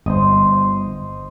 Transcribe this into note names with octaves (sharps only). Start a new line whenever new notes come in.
G1 C5 D#5